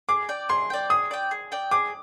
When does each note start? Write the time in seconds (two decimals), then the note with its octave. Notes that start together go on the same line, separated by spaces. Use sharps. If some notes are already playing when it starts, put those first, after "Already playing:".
0.09 G#4 D6
0.29 D5 G5
0.49 G#4 C6
0.70 D5 G5
0.90 G#4 D#6
1.11 D5 G5
1.31 G#4
1.52 D5 G5
1.71 G#4 D6